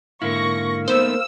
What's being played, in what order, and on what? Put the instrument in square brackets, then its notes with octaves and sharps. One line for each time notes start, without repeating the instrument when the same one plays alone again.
[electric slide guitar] G#2 D3 E4 [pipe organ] A#3 A#4 [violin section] C#6 A#6
[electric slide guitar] A3 B3 D#4 [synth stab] C5 [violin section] E6